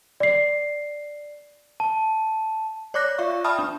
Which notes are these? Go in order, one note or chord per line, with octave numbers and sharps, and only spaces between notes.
D5 C7
A5
C#5 D5 D6 F#6 A#6
F4 D5 E5 F5 C#6
E5 G5 A5 B5 D#6 F6
D4